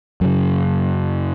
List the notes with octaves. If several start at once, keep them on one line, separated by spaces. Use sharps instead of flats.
F#2 C#3 F#3